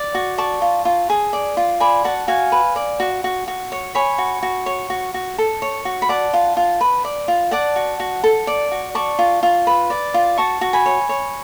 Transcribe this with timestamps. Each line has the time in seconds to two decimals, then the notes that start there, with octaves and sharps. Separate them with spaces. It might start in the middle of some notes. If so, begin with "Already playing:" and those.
Already playing: D5
0.15 F#4
0.38 D5 A5 C#6
0.62 F4
0.85 F4
1.10 G#4
1.33 D5
1.57 F4
1.80 D5 G#5 B5
2.04 F#4 F#5 A5
2.28 F#4 F5 G#5
2.52 B4
2.76 D5
3.00 F#4
3.24 F#4
3.48 F#4
3.72 C#5
3.95 C#5 G#5 B5
4.18 F#4
4.43 F#4
4.66 C#5
4.90 F#4
5.14 F#4
5.38 A4
5.62 C#5
5.85 F#4
6.02 B5
6.09 D5 F#5 A5
6.33 F4
6.57 F4
6.81 B4
7.05 D5
7.28 F4
7.51 D5 F#5 A5
7.76 F#4
8.00 F#4
8.24 A4
8.47 D5
8.72 F#4
8.95 D5 A5 C#6
9.19 F4
9.43 F4
9.67 B4
9.90 D5
10.14 F4
10.38 F#4 A5 C#6
10.61 F#4
10.73 G#5 B5
10.86 C#5
11.09 C#5